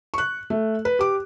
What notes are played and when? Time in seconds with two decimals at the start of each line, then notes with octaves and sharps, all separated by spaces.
0.14 C#6 F#6
0.50 A3
0.85 B4
0.99 G4 D6